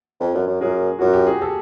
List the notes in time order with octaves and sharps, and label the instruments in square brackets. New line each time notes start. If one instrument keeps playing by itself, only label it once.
[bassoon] F2
F#2
F#2
[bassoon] F#2 [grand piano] G#4 A#4
[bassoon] F#2 [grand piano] F#4
[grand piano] G4
G#4
G4 A4